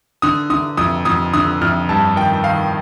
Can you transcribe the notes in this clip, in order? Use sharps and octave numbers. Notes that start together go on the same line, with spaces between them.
D3 D#6
D3 D#6
F2 D#6
F2 D#6
D3 D#6
F2 F6
G2 A5
D#3 G5
D#3 F5